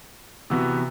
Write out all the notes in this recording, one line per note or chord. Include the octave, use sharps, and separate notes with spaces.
C3 E3 B3 F#4